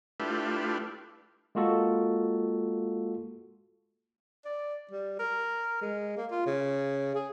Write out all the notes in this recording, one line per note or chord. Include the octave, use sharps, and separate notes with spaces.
A3 D4 E4 F4 G4 B4
G#3 A#3 F4 F#4 A4
D5
G3
A#4
G#3
A#3
F4
C#3
G#4